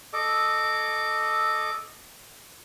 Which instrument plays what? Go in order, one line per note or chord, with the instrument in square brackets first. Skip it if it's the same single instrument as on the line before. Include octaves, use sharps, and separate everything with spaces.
[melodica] A4 D#5 D6